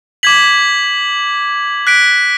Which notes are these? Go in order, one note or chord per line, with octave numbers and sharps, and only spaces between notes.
D6 G#6 B6 F#7
F#6 B6 D7